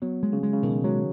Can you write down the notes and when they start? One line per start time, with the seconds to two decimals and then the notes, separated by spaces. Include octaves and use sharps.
0.02 F#3 B3
0.23 G#3
0.33 C#3
0.43 G#3
0.53 C#3
0.63 B2 D#3
0.84 F#3 G#3